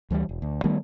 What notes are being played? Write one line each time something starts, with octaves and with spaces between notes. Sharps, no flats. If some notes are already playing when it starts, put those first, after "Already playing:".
D2 E3 F3 G3
E1
D2
D#3 G3 A3 B3